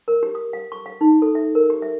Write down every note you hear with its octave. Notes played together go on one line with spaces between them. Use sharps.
A#4
G4
D#6
F5
C#6
F5
D#4
A4
E5
A#4
G4
E5